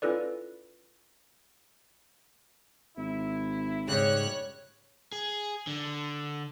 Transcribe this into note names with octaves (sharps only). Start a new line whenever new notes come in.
C#4 E4 F4 A4 B4 D5
G#1 E4
G#2 C#3 G3 C#5 F#6
G#4
D3